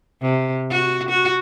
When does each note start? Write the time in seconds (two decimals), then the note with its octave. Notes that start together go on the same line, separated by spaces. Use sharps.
0.22 C3
0.71 F#4
1.09 F#4